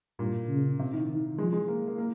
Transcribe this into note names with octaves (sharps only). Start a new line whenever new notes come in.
G2 A#2
C#3
C3
D#3
D#3
F3 G#3
G#3
A#3
A#3
A#3